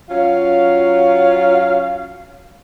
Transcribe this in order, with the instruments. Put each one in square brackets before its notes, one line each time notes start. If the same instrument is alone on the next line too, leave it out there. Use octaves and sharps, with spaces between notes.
[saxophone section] F#3 C#4 F4 F5